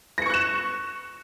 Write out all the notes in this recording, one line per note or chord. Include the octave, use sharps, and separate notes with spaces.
C#6 F#6 A#6 C#7 E7